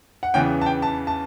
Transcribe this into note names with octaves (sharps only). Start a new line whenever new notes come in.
F#5
E2 C#3 E3 B3 G5
A5
G5
A5
A5